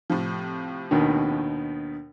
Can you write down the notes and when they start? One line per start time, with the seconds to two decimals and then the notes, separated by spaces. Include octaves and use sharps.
0.10 A2 C3 F3
0.91 D#2 B2 D#3 D4